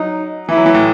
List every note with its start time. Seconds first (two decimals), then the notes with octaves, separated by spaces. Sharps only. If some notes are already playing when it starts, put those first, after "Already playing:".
Already playing: F#3 D#4
0.49 E3 E4
0.57 F#3
0.66 E3
0.74 A2